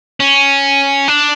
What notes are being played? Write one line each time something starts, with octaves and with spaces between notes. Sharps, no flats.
C#4
D4